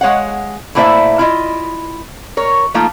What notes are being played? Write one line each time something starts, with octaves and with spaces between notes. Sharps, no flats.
G#3 C#5 F5 F#5
A2 A#3 E4 C5 D5 E5
E4 F4 D#5
A#4 C#5
F3 A3 A#3 D#4 F4